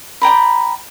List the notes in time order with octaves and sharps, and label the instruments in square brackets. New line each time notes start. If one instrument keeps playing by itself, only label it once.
[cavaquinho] D5 G5 A#5 B5